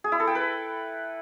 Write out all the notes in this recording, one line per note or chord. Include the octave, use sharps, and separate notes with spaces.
G#4
E4
A4
G5
B4